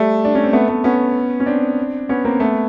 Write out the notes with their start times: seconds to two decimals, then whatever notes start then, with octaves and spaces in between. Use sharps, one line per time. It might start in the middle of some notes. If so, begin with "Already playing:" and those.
Already playing: G3 A3
0.25 D4
0.35 C#4
0.44 C4
0.53 A3 B3
0.68 A3 B3
0.84 B3 C#4
1.40 C#4
1.46 C4 D4
2.09 B3 C#4
2.25 A#3 C4
2.40 A3 B3